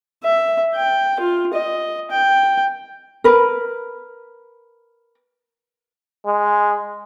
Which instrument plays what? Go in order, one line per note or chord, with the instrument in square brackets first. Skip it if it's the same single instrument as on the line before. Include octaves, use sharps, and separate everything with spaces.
[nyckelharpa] E5
G5
F4
D#5
G5
[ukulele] A#4 B4
[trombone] G#3